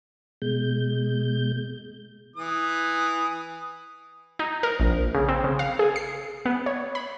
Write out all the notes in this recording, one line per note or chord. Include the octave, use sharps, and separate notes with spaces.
B2 G#3 G6
E3 D#6
D#4
A#4
A#1
C#3
C4
C#3
F5
G#4
C7
B3
C#5
B5